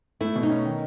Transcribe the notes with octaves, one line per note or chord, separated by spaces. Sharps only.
A3 E4
B2
D#4
C#4
D#3